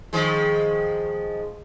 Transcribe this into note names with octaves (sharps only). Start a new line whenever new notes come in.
D#3 F3 G#3